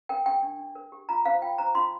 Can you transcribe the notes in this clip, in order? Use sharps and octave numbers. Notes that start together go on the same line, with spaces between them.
A#4 G5
G4 G5
D4
D4
A#4
G4
F4 A#5
C5 F5
F4 G5
C5 A#5
F4 C6